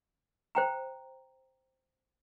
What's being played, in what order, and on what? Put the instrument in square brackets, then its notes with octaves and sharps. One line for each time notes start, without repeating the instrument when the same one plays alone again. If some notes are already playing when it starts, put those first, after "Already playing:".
[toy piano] C5 G5 A#5